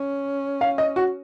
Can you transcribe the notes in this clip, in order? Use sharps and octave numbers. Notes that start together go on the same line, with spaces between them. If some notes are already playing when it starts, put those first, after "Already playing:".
Already playing: C#4
F5
D#5
F#4